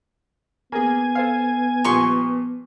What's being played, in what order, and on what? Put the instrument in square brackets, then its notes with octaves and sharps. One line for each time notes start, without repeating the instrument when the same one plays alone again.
[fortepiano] A#3 G#4 [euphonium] B3 [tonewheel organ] G#5
[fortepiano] A4 C5 F5
[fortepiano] A#2 F3 G3 [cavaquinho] C6 C#6